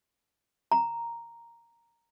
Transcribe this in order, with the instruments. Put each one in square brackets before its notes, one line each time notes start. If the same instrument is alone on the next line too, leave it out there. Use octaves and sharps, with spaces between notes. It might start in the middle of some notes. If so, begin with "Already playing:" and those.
[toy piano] A#5